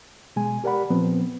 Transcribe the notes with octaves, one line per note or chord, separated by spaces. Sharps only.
B2 G#3 G#5
G4 A#4 D5 F#5 B5
A#2 F3 B3 C4 B4